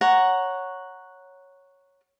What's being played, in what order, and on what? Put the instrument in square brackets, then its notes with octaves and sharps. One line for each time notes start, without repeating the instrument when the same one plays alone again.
[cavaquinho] C#5 F#5 A#5